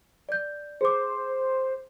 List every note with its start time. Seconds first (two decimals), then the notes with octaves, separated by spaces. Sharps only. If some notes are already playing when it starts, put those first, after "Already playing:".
0.29 D5 G6
0.81 G#4 C5 D6